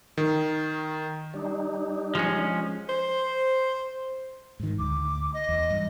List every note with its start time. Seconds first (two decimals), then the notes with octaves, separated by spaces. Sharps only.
0.17 D#3
1.34 G3 D4 D#4
2.15 F3 G#3 C#4
2.89 C5
4.60 G#2 D#3
4.79 D2 D6
5.34 D#5
5.49 E2
5.70 G2